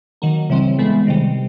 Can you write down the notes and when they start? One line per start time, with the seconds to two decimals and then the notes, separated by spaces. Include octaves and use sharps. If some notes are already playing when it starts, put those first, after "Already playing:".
0.22 D#3 F#3 A#3
0.50 C#3 E3 G3 C4
0.78 A2 E3 G#3 B3
1.07 C3 D#3 G3